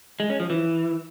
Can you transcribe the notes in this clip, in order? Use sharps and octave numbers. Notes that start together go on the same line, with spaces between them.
G#3
C#4
F3
E3